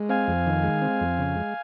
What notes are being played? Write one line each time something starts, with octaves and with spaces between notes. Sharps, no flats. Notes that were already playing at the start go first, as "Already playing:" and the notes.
Already playing: G#3
C4 F5 G#5
F2
D#3
G#3
C4
F2
C#3
G#3